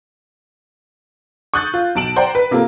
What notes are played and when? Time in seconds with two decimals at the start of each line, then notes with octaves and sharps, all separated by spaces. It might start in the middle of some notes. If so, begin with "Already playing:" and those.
1.54 C#6 D#6 F#6 G6 A6
1.74 F4
1.95 B1 A5 D7 E7 F#7
2.16 C5 D5 F#5 G5 A#5
2.35 B4
2.51 C3 A#3 F4 A4